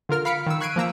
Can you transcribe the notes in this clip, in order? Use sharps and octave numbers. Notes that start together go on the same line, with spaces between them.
D3 F4 A#4 F6
F5 B5 F6 B6 C#7 D7
D#3 E6
C#6 F#6 G#6 C7 D7 D#7
F3 A#3 A#5 E6